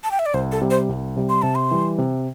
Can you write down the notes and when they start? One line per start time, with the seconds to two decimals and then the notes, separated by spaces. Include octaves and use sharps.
0.04 A5
0.11 G5
0.19 E5
0.26 D5
0.34 C2 C5
0.52 A4
0.62 C3 G3
0.70 C5
0.89 C2
1.16 C3 G3
1.29 C6
1.42 C3 A5
1.55 C6
1.71 E3 G3
1.98 C3